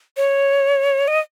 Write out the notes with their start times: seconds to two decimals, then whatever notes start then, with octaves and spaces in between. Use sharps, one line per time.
0.17 C#5
1.08 D#5